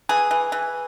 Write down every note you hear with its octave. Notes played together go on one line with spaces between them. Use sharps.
E3 G#4
E3
E3